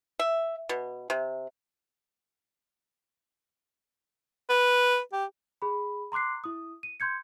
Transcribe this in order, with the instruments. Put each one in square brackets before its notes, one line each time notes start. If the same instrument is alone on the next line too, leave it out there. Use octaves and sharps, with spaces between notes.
[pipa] E5
B2
C3
[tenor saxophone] B4
G4
[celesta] G#4 B5
A#5 C6 D6 F#6 C7
E4 D#6
D#7
C6 G6 G#6 C#7